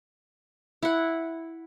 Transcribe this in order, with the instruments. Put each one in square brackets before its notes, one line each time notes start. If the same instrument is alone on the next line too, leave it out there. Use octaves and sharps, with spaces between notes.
[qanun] E4 F#5